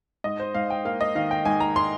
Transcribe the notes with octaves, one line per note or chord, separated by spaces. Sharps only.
G#2 D#5
C5
G#2 F5
G5
A#3 F5
D#5
D#3 F5
G5
G#2 G#5
A#5
C6